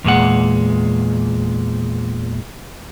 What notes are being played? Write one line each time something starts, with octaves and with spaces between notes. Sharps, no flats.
E2 A#2 G#3 F#5